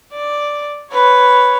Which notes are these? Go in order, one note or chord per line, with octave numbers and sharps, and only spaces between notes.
D5
B4 C#5